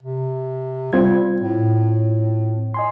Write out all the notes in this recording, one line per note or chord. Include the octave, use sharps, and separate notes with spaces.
C3
G3 C4 F4 G#6
A2
D#5 G#5 C6